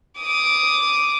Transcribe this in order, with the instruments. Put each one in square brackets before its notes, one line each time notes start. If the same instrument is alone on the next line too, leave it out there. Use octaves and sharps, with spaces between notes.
[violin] D6 D#6